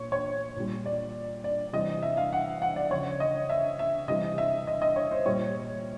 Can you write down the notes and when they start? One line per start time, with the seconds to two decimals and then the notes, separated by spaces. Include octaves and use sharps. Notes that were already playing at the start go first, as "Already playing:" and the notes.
Already playing: A#2 C#5
0.12 C#5
0.56 A#2 G3
0.86 D5
1.44 D5
1.73 C3 E3 G3 D#5
2.03 E5
2.17 F5
2.33 F#5
2.62 F#5
2.76 D5
2.90 C#3 F3 C#5
3.20 D#5
3.50 E5
3.79 E5
4.08 C3 E3 G3 D#5
4.38 E5
4.67 D#5
4.82 D#5
4.96 C#5
5.11 C5
5.26 A#2 G3 C#5